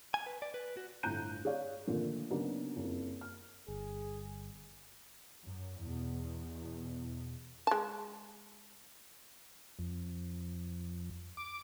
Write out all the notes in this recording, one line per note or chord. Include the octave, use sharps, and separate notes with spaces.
G#5
B4
D5
B4
F#4
G1 A2 A#5 F#6 G6 D#7
G#4 C#5 D5 F5
A#2 D3 D#3 F3 A3
C#3 F#3 A#3 B3 D4 D#4
F#1 F2
F6
G1 G#4
F#2
E2 B2
G#3 A5
F2
D6